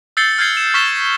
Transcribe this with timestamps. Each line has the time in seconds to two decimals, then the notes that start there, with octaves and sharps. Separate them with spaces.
0.17 E6 G6 A6 C7 C#7 G7
0.38 F6 G6 G#6 C7 G7
0.57 E7
0.74 C#6 F6 A6 B6 E7 G7